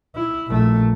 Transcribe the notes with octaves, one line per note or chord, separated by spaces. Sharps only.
E4
A#1 A3